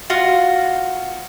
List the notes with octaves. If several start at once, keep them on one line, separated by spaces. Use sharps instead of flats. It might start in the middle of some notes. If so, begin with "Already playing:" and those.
F4 F#4 F5